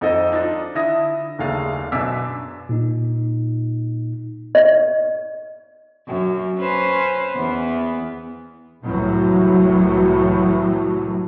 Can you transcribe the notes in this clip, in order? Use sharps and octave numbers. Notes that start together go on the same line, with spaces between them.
F2 D#4 A4 C5 D#5
D4 D#4 F4
D3 E4 E5 D#6 A#6
F#1 D#2 A3 D4 G#4 F5
F#2 B2 D4 D6 E6 B6
A#2 D#4
D#5
F#2
C#4 B4 C5
E2 B3
C2 F#2 A2 E3 F#3